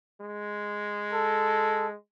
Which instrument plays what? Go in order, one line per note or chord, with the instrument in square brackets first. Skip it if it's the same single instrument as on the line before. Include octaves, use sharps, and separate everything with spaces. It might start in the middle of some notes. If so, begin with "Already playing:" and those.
[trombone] G#3
[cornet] A4